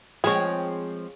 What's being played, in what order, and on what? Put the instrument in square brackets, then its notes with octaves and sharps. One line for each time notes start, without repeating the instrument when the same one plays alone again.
[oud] F3 G#3 C4 [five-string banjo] G#4 C#5